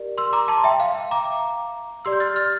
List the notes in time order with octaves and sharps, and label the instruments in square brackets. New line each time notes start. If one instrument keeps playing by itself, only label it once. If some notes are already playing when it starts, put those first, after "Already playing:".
Already playing: [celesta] G4 A#4 D5
C6 E6
A#5 D6
A5 C6
E5 G5
F5
A#5 D6
G4 D5 C6 E6
G6
F6 A6
F6 A6